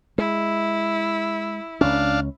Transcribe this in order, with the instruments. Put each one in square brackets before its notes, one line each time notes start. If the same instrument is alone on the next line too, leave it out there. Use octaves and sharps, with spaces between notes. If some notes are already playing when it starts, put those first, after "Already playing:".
[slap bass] G#3 [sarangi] E4
[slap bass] C#2 C#4 [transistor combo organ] D4 F5